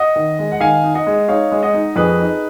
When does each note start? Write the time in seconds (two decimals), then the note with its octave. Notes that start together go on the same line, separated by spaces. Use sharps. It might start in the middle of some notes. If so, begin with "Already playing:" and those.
Already playing: D#5 F#5
0.16 D#3
0.39 G#3
0.52 F#5
0.60 D#3 F5 G#5
0.84 D#4
0.95 D#5 F#5
1.07 G#3
1.28 D#4 C#5 F5
1.52 G#3
1.63 D#5 F#5
1.74 D#4
1.96 F2 G#4 B4
2.20 D#4